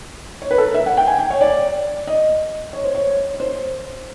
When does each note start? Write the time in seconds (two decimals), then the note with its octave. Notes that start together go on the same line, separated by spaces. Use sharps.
0.42 C#5
0.51 B4
0.58 A4
0.66 A#4
0.74 E5
0.86 F#5
0.97 G5
1.07 G#5
1.19 G5
1.30 C#5
1.41 D5
2.07 D#5
2.73 C#5
2.84 C5
2.95 C#5
3.34 C#5
3.40 C5